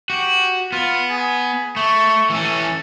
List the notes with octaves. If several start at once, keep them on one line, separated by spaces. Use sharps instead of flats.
F#4 G4
B3 F4
G#4
A3 C#6
E3 C#4 A4